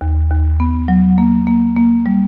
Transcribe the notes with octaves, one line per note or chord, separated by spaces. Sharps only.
D#2
D#2
B3
F#3
A#3
A#3
A#3
G3